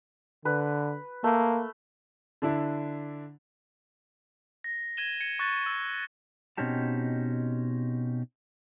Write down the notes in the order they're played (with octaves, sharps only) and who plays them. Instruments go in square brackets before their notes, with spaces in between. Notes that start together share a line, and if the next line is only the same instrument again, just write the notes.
[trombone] D3 [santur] B4
[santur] A3 [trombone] A#3
[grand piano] D3 D4 E4
[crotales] A#6
G#6 D#7 E7 G7
G#6 C#7 D#7
C#6 F#6 A6
E6
[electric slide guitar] B2 C4 C#4 D#4 G4 A5